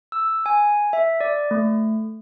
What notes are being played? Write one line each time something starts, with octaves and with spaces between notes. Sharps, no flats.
E6
G#5
E5
D5
A3